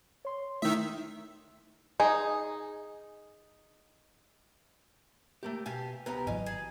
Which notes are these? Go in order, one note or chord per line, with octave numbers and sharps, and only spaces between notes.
C#5 C6
D#3 A3 E4 E5 D#6
D#4 G#4
A3 A#3 G4
B2 G4 F5 G#5 A5
C2 B3 G4 A#4 B4
G#1 E3 F#3 D#5 F5 G#5
G#4